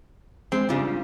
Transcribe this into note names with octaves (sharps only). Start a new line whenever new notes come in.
G#3 C4
G#2 C#3 G3 D4 F4 D5